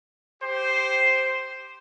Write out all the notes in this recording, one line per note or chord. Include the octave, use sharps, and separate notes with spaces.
G4 C5